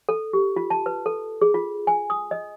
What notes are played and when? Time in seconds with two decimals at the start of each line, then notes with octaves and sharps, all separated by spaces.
0.09 A4
0.33 G4
0.56 F4
0.70 A5
0.86 B4
1.06 A4
1.42 G#4
1.54 F4
1.87 G#5
2.10 D#6
2.31 D#5